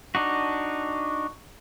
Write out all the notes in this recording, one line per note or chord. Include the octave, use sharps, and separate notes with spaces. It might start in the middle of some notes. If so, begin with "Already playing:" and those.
D4 D#4 F#4